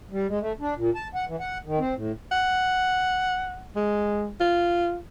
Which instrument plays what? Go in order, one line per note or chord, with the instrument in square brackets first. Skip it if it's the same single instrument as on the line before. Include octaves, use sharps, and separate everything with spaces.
[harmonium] G3
G#3
A3
D4
A#2
A5
F#5
E3
F#5
D#3
C4
A2
[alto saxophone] F#5
G#3
F4